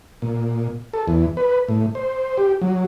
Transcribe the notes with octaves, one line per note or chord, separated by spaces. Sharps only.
A#2
A4
E2
B4
A2
C5
G4
F#3